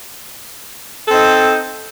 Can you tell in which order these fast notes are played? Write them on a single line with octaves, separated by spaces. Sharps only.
A4 C4 D#4